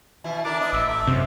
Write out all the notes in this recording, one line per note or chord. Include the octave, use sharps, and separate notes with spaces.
B2 E3 E4
D3 D4 E4 A#4 D6
B3 D#5
A1 E5
A3 E5
F#2 C3